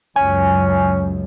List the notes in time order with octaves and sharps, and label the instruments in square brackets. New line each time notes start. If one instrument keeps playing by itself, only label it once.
[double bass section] C#2 F#2 [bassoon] C#4 [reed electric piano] G#5